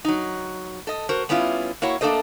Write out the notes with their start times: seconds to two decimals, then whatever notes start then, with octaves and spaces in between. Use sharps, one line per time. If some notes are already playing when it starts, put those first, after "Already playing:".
0.05 F#3 D#4
0.87 A4 D#5
1.09 F#4 A#4 C5
1.29 G3 B3 C#4 E4 F4
1.82 A#3 E4 F#4 C#5
2.01 A3 A#3 D4 A4 C5 D#5